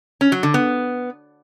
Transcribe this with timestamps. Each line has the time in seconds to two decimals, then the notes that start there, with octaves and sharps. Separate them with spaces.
0.21 C#4
0.32 F#3
0.43 D3
0.54 B3